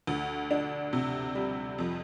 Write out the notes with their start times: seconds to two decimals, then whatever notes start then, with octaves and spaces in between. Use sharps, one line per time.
0.07 D2
0.51 D4
0.93 C3
1.35 G3
1.78 F2